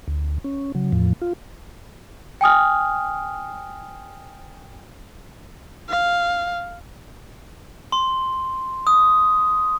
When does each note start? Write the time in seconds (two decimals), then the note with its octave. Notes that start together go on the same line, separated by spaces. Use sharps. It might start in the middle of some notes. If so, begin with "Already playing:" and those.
0.08 D2
0.44 C#4
0.75 C#3 F#3
0.92 E2 A2 F3
1.22 F4
2.41 G5 G#5 D#6 F6
5.89 F5
7.92 C6
8.87 D#6